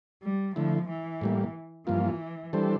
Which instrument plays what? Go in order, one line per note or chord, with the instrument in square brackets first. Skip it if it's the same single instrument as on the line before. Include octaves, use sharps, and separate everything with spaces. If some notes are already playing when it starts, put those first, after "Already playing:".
[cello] G3
[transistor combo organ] D3 A3 E4 [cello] F3
[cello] E3
[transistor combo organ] A2 G3 A#3
[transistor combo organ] G2 F3 A#3 F4 [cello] E3
[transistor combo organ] E3 G3 D4 A4 C5